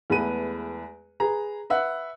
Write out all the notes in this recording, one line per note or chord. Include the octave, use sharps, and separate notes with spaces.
E2 G#3 A3 B3 B4 D#7
G#4 B4 A#5
B4 E5 F#5 F#6